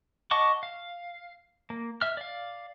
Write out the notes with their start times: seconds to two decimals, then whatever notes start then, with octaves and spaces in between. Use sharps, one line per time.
0.31 D#5 F#5 A5 C#6 D6
0.63 F5
1.70 A#3
2.02 E5 F6
2.17 D5 F5